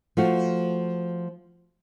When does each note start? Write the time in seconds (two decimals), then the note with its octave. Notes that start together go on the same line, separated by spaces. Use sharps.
0.17 F3 A3 F4 F#4